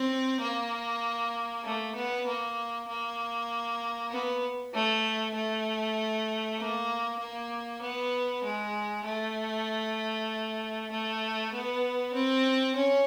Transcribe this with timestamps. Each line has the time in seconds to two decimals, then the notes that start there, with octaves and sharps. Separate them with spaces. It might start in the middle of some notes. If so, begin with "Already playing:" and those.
Already playing: C4
0.41 A#3
1.64 A3
1.95 B3
2.26 A#3
2.88 A#3
4.11 B3
4.74 A3
5.35 A3
6.58 A#3
7.20 A#3
7.81 B3
8.44 G#3
9.05 A3
10.91 A3
11.53 B3
12.14 C4
12.76 C#4